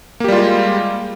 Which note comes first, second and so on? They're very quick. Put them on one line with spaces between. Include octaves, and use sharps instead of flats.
A#3 G4 G3 F4 G#3